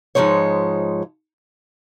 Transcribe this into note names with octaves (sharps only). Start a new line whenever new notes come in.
G#2 F3 G#3 D#4 C#5